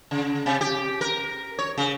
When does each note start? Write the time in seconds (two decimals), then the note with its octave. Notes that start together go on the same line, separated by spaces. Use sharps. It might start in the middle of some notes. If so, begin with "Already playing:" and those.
0.11 C#3
0.46 C3
0.61 G4
1.01 A#4
1.59 C#5
1.78 C#3